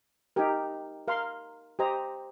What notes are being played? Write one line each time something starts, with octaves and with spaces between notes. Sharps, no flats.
D#4 G4 A#4
A#4 F5 C6
G4 C5 D#5 A#5